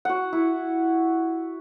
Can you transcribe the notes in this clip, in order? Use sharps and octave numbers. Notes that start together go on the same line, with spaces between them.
F#4 F#5
E4